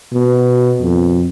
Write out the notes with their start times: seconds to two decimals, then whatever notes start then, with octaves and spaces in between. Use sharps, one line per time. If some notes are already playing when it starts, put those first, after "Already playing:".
0.13 B2
0.81 F2